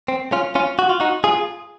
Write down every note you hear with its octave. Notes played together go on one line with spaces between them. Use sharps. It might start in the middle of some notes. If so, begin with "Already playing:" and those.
C4
C#4 F4
C#4 F4
F#4
F4
D#4 F#4
F4 G#4